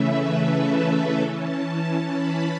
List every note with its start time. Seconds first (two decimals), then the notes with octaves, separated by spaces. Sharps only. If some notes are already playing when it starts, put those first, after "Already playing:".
Already playing: C#3 E3 A3 C#4 B4 E5
0.34 A4
1.20 E3 C#4 A5
2.06 B5